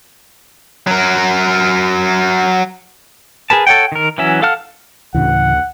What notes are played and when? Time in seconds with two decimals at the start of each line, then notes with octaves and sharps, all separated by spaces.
0.87 F#3 A#4
3.50 G#4 A#4 B4 A5
3.67 A4 C#5 F#5 G5
3.92 D#3 A#4
4.18 E3 F#3 C#4 E5
4.42 A4 F5 F#5 A5 F6
5.15 D2 A2 C#3 E3 F#5